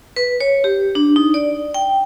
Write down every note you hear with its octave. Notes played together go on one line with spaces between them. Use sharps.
B4
C#5
G4
D4
D#4
D5
G5